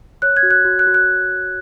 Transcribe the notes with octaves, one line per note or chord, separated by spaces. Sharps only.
C#5 F#6
G#6
F#4
F#6
F#4
F#6
F#4
F#6